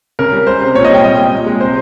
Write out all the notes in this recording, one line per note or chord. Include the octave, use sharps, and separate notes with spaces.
C#3 A#4
G3
G#3 C5
C3
A#2 C#5
D#5
G3 G5
A#2 D#5
G#3
A#2
G#3
C3 C5